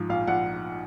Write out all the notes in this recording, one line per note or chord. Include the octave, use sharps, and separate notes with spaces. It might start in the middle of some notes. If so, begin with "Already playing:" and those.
Already playing: G#2 F3
A#1 F5
A#1 F#5